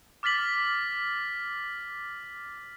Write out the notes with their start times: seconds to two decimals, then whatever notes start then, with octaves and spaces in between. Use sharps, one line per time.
0.23 D6 F6 A6 B6 F#7